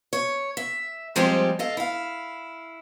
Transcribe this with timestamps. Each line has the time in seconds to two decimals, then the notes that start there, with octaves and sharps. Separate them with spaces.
0.13 C#5
0.57 E5
1.16 F3 G3 G#3 C4 G4
1.59 A4 D#5 F5
1.77 E4 F5